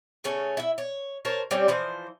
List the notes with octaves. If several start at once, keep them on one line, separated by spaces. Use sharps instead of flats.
C#3 A3 C#4
E4 E5
C#5
A#4 C5 C#5 A5
G3 C4 C#4 G4
E3 F3 C5